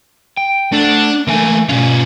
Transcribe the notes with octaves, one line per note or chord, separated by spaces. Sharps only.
G5
A3 D4 A4 F#5
E3 A3 A#3 G#5
B2 C#4 F4